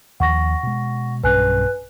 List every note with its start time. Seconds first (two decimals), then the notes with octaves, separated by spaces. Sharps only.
0.20 D#2 F3 F#5 C#6 A#6
0.63 B2 G#3
1.23 B1 G2 C#4 B4 G#5 F#6